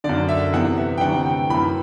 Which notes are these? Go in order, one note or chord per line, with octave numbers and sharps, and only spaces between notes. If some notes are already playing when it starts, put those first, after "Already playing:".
D3 D5
F#2
E5
E2 C3 E3 F#5
E5
G5
D2 C3 E3 F#5
G5
F#2 E3 B5